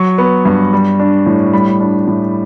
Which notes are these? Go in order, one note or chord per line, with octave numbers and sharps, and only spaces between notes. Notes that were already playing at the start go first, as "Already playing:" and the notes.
Already playing: F#3 C#6
B3
G2
G3
D4
A2
G3 B5
D4
A2